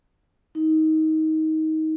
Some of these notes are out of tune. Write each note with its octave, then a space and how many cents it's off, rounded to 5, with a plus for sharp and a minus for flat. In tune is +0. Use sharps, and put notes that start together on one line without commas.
D#4 +20